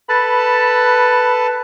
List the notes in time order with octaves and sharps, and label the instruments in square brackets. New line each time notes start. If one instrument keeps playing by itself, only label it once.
[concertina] A4 B4 A5 [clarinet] B5